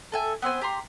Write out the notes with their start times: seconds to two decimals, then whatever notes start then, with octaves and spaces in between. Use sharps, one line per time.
0.12 A4 E5 G#5
0.42 B3 C4 C5 G#5
0.61 G4 A#5 C6